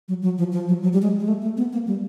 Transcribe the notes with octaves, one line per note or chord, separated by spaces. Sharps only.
F#3
F#3
F3
F3
F#3
F#3
G3
G#3
G#3
A3
A3
B3
A#3
G3